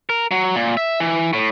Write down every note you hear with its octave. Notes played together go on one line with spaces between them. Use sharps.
A#4
F#3
A#2
E5
E3
A2